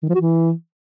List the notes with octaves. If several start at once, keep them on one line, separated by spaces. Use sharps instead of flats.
D#3
F3
F#4
E3